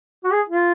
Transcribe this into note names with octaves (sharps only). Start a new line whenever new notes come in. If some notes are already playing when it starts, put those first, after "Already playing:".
F#4
G#4
F4